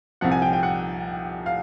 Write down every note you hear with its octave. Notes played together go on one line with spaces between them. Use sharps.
C2 C3 F3 F#5
G#5
G5
G5
F#5
F5